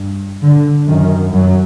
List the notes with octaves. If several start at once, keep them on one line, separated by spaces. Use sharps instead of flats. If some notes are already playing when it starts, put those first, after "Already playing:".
Already playing: G2
D3
F#2 D#3
F#2 F#3